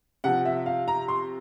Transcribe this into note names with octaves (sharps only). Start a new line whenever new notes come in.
C3 F3 F#5
E5
F5
A#5
C6